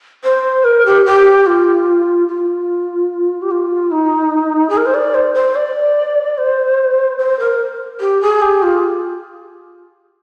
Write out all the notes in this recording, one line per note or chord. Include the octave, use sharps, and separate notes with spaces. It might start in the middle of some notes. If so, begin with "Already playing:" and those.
C5
A#4
G4
G4
F4
F4
G4
F4
D#4
G#4
A#4
C5
D5
C5
C5
D5
C5
C5
A#4
G4
G#4
G4
F4